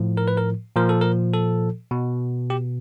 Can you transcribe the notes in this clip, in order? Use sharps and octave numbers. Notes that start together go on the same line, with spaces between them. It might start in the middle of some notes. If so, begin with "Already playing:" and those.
Already playing: A2 F3
A#4
B4
A#4
A#2 F3 A#4
A4
A#4
A4
B2
G4